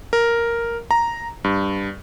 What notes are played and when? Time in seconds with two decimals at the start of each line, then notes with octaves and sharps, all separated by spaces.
0.13 A#4
0.91 A#5
1.44 G2